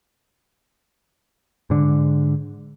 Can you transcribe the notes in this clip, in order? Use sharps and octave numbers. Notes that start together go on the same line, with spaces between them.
G#2 D3